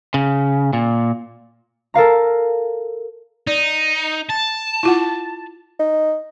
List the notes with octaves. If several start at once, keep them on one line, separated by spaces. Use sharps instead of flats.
C#3
A#2
A4 A#4 F5 A#5
D#4 D5
A5
E4 F4 F#5
D#4